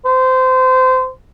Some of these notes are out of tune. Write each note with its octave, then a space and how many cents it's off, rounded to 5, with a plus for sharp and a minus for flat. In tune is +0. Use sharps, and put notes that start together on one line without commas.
C5 -25